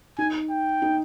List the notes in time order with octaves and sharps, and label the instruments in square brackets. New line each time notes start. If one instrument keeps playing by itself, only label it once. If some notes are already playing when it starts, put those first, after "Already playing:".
[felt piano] D#4 [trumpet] G#5
[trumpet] G5
[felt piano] D#4